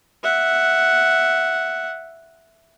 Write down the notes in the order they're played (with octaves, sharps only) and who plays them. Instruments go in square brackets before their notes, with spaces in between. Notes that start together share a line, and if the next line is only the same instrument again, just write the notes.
[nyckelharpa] E5 F#5